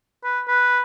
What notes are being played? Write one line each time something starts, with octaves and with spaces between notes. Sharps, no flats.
B4
B4